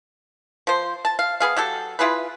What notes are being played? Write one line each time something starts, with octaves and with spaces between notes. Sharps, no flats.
F3 C5
A5
F5
B3 G#4 F5
F#3 G4 A4
E4 F4 G#4 B4